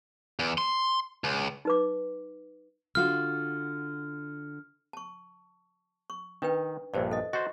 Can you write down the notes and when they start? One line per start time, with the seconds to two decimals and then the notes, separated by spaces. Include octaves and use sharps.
0.39 E2
0.58 C6
1.24 C#2
1.65 D#4 B4 D6
2.95 D3 F4 F#4 F6
4.93 A5 C#6
6.10 C#6
6.42 D#3 D4 B4 G5
6.94 A#1 G2 C5 D5
7.11 A4 D#5
7.33 F#4 C5 D#5